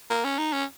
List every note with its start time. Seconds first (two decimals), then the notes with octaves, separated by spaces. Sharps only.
0.11 A#3
0.25 C#4
0.39 D#4
0.53 C#4